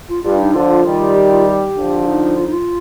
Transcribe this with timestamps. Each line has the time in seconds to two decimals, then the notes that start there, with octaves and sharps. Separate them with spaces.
0.09 F4
0.23 G2 F4
0.39 D#4
0.54 D3 F3 F4
0.84 D#3 G3
1.15 G4
1.30 F4
1.45 G4
1.75 D3 F3
2.06 D#4
2.36 F4
2.44 D#4
2.52 F4